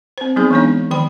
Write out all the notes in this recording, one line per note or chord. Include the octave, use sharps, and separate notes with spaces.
C4 C5
F#3 B3 C4 D#4 G#4
E3 G#3 B3 D4 C#5
D#3 F3 G5 B5